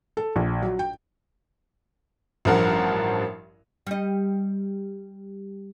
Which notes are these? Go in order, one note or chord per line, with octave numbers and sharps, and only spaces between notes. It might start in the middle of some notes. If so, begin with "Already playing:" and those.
A4
A#1
F#3
G5
A1 G2 F3 A#4 F#5
G3 D#5